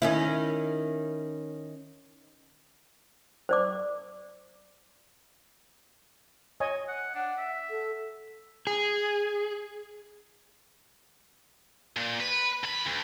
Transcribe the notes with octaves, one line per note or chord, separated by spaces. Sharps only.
D#3 C#4 E4
C5 D5 D6
C#5 D#5 G#5
F#5
D4 F#5
E5
A4
G#4
A#2
B4
D#2 B5
D2